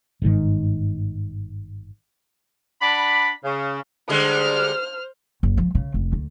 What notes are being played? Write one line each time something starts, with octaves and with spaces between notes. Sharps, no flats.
G1 G#2 D3 D#3
D4 D5 F#5 B5
C#3
D3 G3 G#3 C5 F6
F#1
F3
C#3
F1
D2